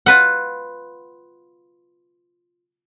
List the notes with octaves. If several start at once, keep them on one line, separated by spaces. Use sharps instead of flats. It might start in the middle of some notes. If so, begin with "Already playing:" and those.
F4 B4 F#5